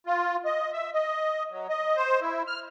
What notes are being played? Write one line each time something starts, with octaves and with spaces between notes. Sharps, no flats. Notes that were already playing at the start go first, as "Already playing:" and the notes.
F4
D#5
E5
D#5
F#3
D#5
C5
E4
F6